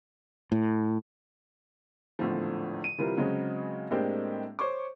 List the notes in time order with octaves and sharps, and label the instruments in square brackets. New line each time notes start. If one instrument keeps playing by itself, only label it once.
[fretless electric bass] A2
[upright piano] G#1 E2 A2 D3 F3
D#7
C3 E3 G3 F4 A#4 B4
C#3 F#3 G#3 C4 C#4
A2 G#3 A#3 C4 D4 G4
C5 C#5 C#6 D6